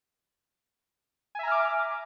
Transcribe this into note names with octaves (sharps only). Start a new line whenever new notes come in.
E5 G#5 A#5 D6 F6